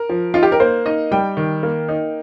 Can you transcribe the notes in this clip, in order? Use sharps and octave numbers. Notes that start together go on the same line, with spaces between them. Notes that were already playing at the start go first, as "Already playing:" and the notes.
Already playing: A#4
F3
D#4 F4
G4
A#4
A#3 C5
D#4 D#5
G3 G5
D#3
A#3
D#4